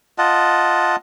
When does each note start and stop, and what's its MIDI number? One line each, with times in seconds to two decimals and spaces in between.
0.18 0.96 65
0.18 0.96 75
0.18 0.96 78
0.18 0.96 81